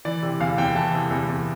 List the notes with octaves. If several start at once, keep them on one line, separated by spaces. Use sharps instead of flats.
E3 D5
C3
E2 F5
E2 G5
E3 A5
C3
E2
E2